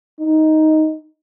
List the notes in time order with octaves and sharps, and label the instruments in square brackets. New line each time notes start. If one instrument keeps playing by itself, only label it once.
[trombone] D#4